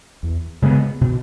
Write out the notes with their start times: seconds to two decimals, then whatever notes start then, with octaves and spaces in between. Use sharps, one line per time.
0.23 E2
0.62 C#3 G#3 B3
1.01 B2